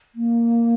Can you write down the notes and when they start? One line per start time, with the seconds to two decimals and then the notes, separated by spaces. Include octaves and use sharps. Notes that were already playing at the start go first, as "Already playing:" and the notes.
0.15 A#3